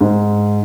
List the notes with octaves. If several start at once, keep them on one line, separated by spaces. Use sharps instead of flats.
G#2